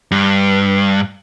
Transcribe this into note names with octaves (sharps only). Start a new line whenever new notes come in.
G2